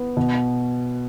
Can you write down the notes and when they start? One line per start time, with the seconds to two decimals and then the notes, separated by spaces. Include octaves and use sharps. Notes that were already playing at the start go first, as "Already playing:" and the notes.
Already playing: B3
0.17 B2